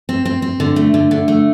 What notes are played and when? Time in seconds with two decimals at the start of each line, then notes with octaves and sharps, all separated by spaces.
0.09 C4
0.25 C4
0.42 C4
0.60 D3
0.76 A3
0.94 D3
1.11 D3
1.28 A3